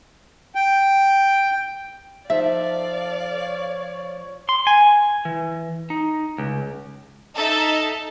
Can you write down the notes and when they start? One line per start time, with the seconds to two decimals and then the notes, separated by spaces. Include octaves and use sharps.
0.55 G5
2.30 F3 D#4 A4 D5 E5 F5
3.36 C#5
4.49 C6
4.67 G#5
5.25 E3
5.90 D#4
6.38 C#2
7.35 D#4 A4 E5 A5